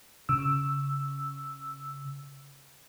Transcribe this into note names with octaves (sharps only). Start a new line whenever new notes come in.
C#3 E6